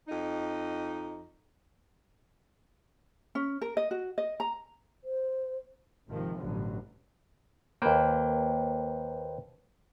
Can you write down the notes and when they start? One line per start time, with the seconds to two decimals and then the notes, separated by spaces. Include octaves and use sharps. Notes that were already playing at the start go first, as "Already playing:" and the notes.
0.07 F2 D#4
3.35 C#4
3.61 A#4
3.77 D#5
3.91 F#4
4.18 D#5
4.40 A#5
5.04 C5
6.08 G#1 C3 D#3 F3
6.37 A1 G2 B2 D3 F3 F#3
7.82 D#2 A#3 B4 C5 G5